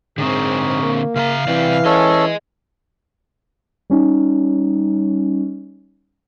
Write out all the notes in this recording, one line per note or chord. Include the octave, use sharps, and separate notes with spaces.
G#2 D3 C4 G#4 A#4 C#5
A#3
C#3 B4 F5 A#5
C3 E3 C4 D5
C#4 G#4 A4 D#5
G3 C#4 D#4